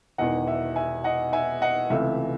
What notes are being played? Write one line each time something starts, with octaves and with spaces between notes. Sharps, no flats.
E1 E2 D#3 D#5 F#5
E5
E5 G#5
D#5 F#5
E5 G#5
D#5 F#5
C#2 C3 E3 A3 E5